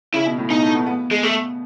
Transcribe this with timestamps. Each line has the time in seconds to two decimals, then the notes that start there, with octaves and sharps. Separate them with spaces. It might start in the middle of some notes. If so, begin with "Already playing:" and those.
0.14 C#3 E4
0.26 B2
0.38 A2
0.50 B2 D#4
0.62 A3
0.74 B3
0.86 B3
1.11 G#3
1.23 A3